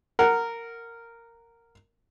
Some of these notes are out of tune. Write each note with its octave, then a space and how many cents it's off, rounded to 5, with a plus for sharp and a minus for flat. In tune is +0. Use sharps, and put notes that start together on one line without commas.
A#4 -10 F#5 +0